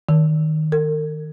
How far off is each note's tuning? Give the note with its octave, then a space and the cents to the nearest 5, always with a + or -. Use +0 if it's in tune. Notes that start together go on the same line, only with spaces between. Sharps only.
D#3 -5
A#4 -45